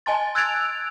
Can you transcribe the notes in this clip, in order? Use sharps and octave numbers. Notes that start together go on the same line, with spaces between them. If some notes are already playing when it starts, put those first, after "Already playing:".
D#5 G#5 A5 C6 A6
E6 F#6 G#6 A6 D7 F7